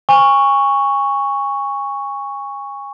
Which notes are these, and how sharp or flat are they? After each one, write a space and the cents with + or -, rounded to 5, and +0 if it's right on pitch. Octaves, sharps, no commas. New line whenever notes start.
G#5 -30 C#6 +0